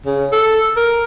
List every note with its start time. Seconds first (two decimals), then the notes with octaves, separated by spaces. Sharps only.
0.06 C#3
0.32 A4
0.76 A#4